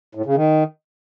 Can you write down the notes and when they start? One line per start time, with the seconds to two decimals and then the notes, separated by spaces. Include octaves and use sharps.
0.15 A2
0.26 C#3
0.36 D#3